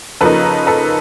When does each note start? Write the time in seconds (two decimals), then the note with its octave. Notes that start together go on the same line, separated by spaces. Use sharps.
0.21 C#3 F3 A#3 D#4 A4 B4
0.67 A4 B4